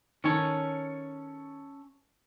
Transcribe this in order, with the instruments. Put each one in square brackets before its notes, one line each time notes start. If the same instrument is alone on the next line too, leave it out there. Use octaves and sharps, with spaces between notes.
[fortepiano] D#3 [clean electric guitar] C#4 A4 C#5